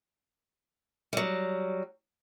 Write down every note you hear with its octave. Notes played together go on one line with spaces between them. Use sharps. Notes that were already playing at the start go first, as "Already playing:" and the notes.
F#3 G3